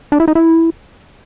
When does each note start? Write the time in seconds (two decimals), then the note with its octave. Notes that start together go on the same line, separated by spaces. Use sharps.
0.12 D4
0.20 E4
0.28 D#4
0.35 E4